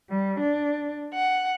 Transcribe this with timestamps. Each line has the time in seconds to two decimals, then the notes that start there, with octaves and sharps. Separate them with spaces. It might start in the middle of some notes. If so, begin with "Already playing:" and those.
0.10 G3
0.40 D4
1.14 F#5